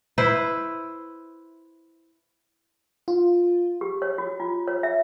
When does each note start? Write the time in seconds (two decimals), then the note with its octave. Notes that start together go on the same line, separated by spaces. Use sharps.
0.18 E4 B4 C5
3.08 F4
3.81 G4
4.02 C#5
4.18 F#4
4.40 F4
4.68 C#5
4.83 E5